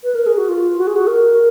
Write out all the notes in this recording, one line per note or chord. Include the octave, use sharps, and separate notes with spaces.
B4
A#4
G#4
F#4
F4
F#4
G#4
F#4
A#4